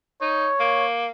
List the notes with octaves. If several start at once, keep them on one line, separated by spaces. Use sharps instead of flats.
D#4 C#5
A#3